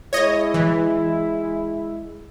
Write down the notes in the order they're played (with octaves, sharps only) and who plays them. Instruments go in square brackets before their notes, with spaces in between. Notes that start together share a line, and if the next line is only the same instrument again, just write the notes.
[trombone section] G#3 E4 [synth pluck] C#5 D#5
[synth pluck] E3